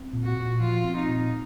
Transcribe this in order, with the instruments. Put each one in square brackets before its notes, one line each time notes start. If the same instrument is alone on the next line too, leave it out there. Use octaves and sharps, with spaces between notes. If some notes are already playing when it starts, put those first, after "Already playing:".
Already playing: [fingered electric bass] C4
A#2
[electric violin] F#4
[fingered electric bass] A#2
[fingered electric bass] F3 [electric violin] F4
[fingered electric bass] C4
[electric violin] D#4
[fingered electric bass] A#2